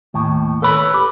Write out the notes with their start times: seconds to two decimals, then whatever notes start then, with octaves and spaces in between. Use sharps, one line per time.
0.14 D#2 A2
0.62 A4 B4 C#5 B5
0.94 G4